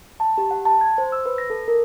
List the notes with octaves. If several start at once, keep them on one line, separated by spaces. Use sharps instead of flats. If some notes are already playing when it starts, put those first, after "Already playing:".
A5
G4
F#5
A5
G#6
C5
E6
B4
A#6
A4
A#4